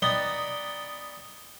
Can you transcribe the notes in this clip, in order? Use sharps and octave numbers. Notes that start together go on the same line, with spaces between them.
B3 D#4 D5 G5